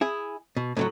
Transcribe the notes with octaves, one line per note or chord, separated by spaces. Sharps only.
E4 G#4
B2
A2 E3 F#3